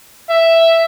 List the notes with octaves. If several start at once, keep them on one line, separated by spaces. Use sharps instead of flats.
E5